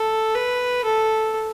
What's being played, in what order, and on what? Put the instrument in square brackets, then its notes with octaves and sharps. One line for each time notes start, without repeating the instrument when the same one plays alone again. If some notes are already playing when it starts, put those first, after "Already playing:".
Already playing: [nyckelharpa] A4
B4
A4